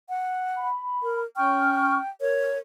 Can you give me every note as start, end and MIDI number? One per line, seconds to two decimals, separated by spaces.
0.09 0.68 78
0.56 1.19 83
1.03 1.24 70
1.37 1.97 61
1.37 2.09 79
1.37 1.97 85
1.37 1.97 89
2.21 2.59 70
2.21 2.58 73